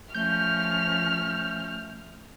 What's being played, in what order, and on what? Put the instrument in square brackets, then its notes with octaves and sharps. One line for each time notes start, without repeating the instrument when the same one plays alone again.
[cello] F3 C#4 [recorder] A3 [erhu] F6 [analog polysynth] G6